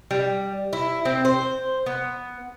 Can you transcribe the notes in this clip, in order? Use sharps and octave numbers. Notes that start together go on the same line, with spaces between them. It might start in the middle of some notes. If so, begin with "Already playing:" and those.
G3
E4
C4
C5
B3